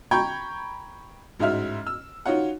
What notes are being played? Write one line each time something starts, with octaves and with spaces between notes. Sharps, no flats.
G5 A#5 B5 C#6 G6 G#6
A1 G#2 D#4 F#4 E5 F6
E6
D#4 F4 F#4 C#5 F#5